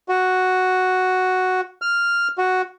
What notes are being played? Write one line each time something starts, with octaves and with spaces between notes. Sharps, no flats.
F#4
F6
F#4